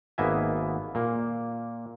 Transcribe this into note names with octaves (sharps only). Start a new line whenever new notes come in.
G#1 A#3 B3 D#5 E5 G#5
A#2 A#3